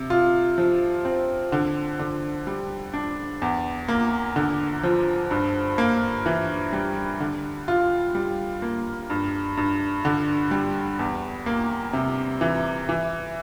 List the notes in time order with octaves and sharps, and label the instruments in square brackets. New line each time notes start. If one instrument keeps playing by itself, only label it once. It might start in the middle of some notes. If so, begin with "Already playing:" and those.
Already playing: [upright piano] C3
F4
F3
C4
D3
D3
G3
D4
E2
A#3
D3
F3
G2
A#3
E3
G3
D3
F4
G3
A#3
G2
G2
D3
G3
E2
A#3
C3
E3
E3